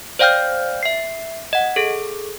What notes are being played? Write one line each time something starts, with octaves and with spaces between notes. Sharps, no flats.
C5 D5 F5 G5 F6 G6
E5 C7
D#5 F#5
G#4 A4